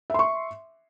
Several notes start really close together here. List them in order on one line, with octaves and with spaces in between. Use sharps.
E5 C6 C#6